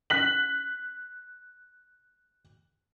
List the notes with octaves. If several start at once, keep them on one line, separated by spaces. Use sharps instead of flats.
F#6 B6 F#7